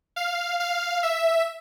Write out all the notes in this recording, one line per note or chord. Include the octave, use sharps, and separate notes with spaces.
F5
F5
E5